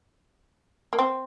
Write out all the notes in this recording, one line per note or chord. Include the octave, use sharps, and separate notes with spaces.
A#3
C4